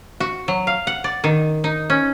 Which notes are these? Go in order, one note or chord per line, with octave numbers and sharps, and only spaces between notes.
F#4
F#3
F5
F#5
D5
D#3
D#4
C#4